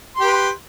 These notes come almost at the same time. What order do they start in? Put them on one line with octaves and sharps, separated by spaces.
C6 G4 B4